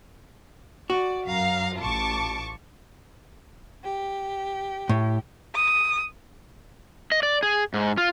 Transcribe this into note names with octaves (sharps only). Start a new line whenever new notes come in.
F#4 D5
F#2 F5 A#5
A1 F4 A5 C#6 D6
G4
A2
D#6
D#5
D5
G#4
G#2
F4